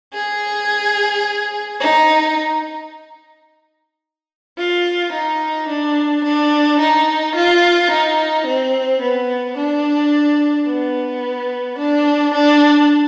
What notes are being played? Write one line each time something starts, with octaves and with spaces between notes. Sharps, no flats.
G#4
D#4
F4
D#4
D4
D4
D#4
F4
D#4
C4
B3
D4
B3
D4
D4